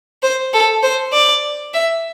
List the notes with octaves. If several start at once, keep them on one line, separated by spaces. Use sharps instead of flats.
C5
A4
C5
D5
E5